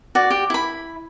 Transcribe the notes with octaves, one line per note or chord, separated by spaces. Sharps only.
F#4 D5
G4
E4 B5